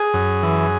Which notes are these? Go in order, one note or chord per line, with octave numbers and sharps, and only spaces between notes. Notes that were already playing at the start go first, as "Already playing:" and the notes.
Already playing: G#4
F#2
E3